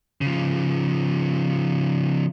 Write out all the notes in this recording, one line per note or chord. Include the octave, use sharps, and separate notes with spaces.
C#3 F3